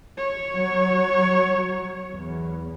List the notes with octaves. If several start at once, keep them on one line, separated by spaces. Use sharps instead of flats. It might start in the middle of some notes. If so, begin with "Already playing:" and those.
C#5
F#3
E2